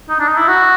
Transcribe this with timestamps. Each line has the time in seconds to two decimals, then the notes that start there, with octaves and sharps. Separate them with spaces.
0.09 D#4
0.19 D4
0.28 D#4
0.37 E4
0.48 F#4